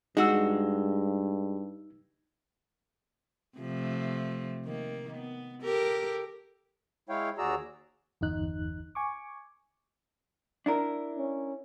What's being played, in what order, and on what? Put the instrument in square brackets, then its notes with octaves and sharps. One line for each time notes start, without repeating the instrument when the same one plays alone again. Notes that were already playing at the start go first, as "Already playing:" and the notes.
[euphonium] G2 [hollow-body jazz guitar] G#3 F#4 [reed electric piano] D#4 E6
[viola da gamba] C3 F3 A3
D#3 A#3
B3
G4 A4 A#4
[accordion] G#3 E4 C#5 F5 G5
D#2 F#4 G#4 D5 A#5 E6
[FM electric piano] G1 E2 D#4 F#6
G#5 C#6 D6
[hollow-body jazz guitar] D4 E4 A#4
[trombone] C#4